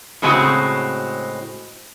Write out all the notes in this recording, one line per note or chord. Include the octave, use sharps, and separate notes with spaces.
A2 C#3 G#3 C4 F#4